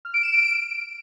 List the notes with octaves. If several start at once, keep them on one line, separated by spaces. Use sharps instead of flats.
F6
D7
E7
D7